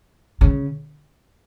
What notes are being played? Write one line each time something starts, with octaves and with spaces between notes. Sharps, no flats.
C#3